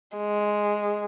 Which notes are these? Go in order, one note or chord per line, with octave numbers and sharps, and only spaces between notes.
G#3